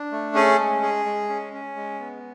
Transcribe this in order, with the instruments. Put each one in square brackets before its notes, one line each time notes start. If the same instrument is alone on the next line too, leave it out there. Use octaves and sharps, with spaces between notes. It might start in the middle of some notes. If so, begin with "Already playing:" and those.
Already playing: [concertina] D4
A3
C#4 G#4
G#3
G#4
G#3
C#4
C#4
G#3
B3